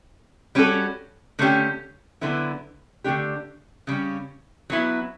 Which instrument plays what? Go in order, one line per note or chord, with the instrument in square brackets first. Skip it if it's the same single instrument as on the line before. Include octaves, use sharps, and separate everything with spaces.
[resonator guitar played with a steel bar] G3 C#4 F#4 A4
D3 A3 C#4 G4
D3 F#3 B3 E4
D3 A3 D4 G4
C#3 G3 C#4
F#3 B3 E4